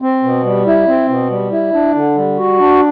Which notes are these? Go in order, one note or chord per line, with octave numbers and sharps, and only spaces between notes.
C4
B2
G3
E4
C4
B2
G3
E4
D4
D3
G3
F#4
D4